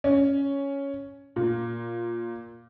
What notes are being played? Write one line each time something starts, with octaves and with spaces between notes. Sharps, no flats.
C#4
A#2